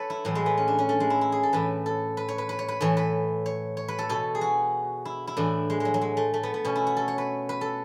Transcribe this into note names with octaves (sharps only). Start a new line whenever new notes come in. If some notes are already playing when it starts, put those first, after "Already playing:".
Already playing: A4 B4 C#5
E4
A2 E3 F#3
G#3
B3
C#4
D4
C#4
A3
G#3
E4
E4
G#4
A4
A2 E3 B4
A4
B4
C#5
B4
B4
C#5
B4
A2 E3 C#5
B4
C#5
C#5
B4
A4
B2 A4
G#4
F#4
E4
E4
A2 E3 D4
G#3
F#3 G#3
F#3
G#3
A3
A3
B3
B3
B2 C#4
E4
F#4
A4
C#5
B4
B4
A4